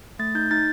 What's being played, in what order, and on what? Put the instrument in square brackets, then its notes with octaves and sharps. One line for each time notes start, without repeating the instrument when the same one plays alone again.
[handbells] A3 A6
D#4 G6
D#4 A6